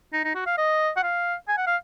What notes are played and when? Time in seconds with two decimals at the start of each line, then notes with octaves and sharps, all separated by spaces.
0.13 D#4
0.24 D#4
0.35 F#4
0.46 F5
0.58 D#5
0.97 F#5
1.03 F5
1.48 G#5
1.58 F#5
1.67 F5